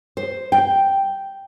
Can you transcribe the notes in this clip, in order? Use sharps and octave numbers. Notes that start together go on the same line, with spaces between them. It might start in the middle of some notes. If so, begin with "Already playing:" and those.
C5
G5